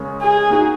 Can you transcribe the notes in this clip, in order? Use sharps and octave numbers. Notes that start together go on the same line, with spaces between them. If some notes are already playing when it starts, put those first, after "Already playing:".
Already playing: C#3 G#3 C#4 A#4 C#5
G#4
A#3 D#4 F#4